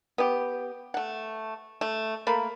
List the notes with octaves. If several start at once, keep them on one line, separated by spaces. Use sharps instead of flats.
B3 G4
A3 F#5
A3
A3 A#3 B5